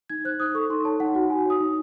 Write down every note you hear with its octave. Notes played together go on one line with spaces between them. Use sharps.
D#4 G#6
C5 F#6
D#4 D#6
A4 C#6
D#4 C6
C#5 A5
D#4 F#5
F#4 F#5
D#4 G#5
C#5 D#6
D#4